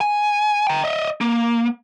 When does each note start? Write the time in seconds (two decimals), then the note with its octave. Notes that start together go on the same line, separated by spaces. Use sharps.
0.01 G#5
0.67 G5 A#5
0.84 D#5 E5
1.21 A#3